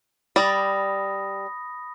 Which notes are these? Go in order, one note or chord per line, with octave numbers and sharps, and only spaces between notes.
G3 D5 B5 D#6 A#6